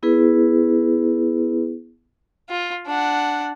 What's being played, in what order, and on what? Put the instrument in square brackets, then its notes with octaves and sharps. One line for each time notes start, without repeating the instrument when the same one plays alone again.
[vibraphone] B3 E4 G#4 B4
[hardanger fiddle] F4
D4 F#5